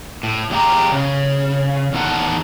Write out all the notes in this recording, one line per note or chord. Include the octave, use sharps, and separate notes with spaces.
A2
E2 G#3 G4 F5 A#5
C#3
E2 A2 D#3 A#3 F#5 A5